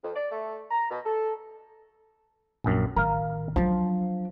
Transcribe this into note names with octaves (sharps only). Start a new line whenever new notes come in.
F2
D5
A3
A#5
B2
A4
A#1 F#2
A1 D#3 A#4 F5
F3 F#3 D4